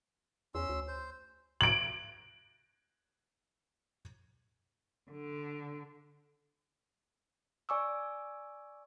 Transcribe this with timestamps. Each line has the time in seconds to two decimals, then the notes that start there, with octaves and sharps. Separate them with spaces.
0.55 E2 C#4 C6 E6
0.69 D2
0.88 C5
1.61 D7 F#7
5.11 D3
7.69 D5 G#5 C#6 D6 E6